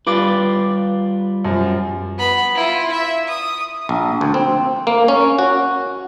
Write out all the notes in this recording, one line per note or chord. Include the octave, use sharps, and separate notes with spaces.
G3 F4 B4 D6 A6
F#2 F3
B3 B5
E4 F4
E5
D#6
A#1
D2
C4
A#3
C#4
F#4